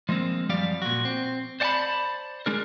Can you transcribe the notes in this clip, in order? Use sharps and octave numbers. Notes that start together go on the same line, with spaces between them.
F3 G#3 A#3 C4
F#2 F3 G3 G4 D5 F5
A#2 F#4
C4
C5 D5 F#5 G#5 A5 B5
G#3 D4 A#4